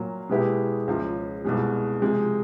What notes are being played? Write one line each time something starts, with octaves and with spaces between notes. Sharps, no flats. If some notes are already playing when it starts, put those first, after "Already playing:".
Already playing: A#2 F#3 A#3
B2 G#3 B3 E4 G4
C#2 C#3 F3
C2 B2 G#3
C3 F3 G#3